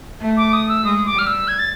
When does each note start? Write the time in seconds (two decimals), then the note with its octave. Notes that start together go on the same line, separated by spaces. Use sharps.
0.21 A3
0.37 D6
0.53 D#6
0.69 E6
0.84 G#3 D#6
1.06 D6
1.16 G3 F6
1.26 E6
1.48 G#6
1.59 A6